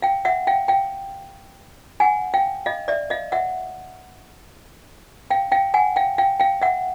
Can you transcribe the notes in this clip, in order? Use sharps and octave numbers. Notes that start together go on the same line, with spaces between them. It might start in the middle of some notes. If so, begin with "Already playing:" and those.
F5 G5
E5 F#5
F5 G5
F5 G5
F#5 G#5
F5 G5
D#5 F5
D5 E5
D#5 F5
E5 F#5
F5 G5
F5 G5
F#5 G#5
F5 G5
F5 G5
F5 G5
E5 F#5